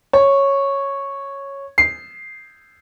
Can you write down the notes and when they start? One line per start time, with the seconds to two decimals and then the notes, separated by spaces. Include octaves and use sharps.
0.13 C#5
1.78 C7